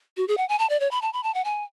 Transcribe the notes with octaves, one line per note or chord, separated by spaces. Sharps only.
F#4
G#4
F#5
G#5
A5
D5
C#5
B5
A5
B5
A5
F#5
G#5